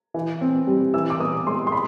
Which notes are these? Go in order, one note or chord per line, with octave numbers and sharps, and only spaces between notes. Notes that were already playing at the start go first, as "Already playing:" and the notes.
E3
C4
G3
E3 E6
D6
B3 D#6
G#3 C6
C6
B5